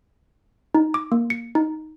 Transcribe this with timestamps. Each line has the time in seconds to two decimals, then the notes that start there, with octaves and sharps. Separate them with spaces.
0.75 D#4
0.94 D6
1.12 A#3
1.30 C#7
1.55 D#4